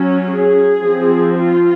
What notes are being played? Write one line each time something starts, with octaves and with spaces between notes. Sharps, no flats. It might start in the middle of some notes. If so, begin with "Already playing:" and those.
Already playing: F#3 C#4
G#4
F3 C4
F4